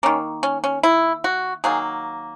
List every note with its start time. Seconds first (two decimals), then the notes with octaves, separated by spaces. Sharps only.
0.03 D#3 A#3 C#4
0.43 C#4
0.64 C#4
0.83 E4
1.24 F#4
1.64 D#3 F#3 A#3 G#4